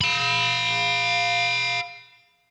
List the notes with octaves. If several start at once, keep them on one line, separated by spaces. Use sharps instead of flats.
F5 B5